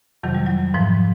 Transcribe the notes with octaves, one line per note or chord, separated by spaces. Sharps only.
F2 C3 D#3 F#3
G3
F#3
G#2 E3 F3